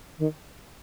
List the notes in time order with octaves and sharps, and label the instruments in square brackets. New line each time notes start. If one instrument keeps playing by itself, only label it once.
[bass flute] D#3